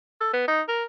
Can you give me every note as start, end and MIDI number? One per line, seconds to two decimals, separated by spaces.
0.21 0.30 69
0.34 0.44 59
0.48 0.61 63
0.68 0.84 70